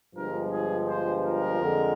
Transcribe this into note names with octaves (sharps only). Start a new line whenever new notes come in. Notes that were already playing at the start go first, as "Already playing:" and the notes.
G1 G2 F3 G#3 A#4
G#4
C5
A#4
F2 D3 G#3